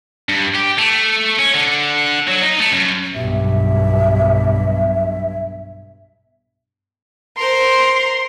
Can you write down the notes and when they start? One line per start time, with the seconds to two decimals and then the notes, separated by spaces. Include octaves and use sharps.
0.29 G2
0.55 G4
0.79 A3
1.39 C#4
1.55 D3
2.28 F#3
2.43 D#4
2.60 A3
2.73 F#2
3.15 B1 G2 B2 E5
7.37 A#4 C5 C6